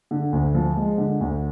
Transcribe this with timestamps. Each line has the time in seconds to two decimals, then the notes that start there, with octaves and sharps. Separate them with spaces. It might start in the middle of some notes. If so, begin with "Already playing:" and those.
0.11 D3
0.33 D2
0.55 F3
0.77 G#3
0.98 D3
1.21 D2